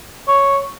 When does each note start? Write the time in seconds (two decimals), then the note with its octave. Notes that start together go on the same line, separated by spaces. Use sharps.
0.28 C#5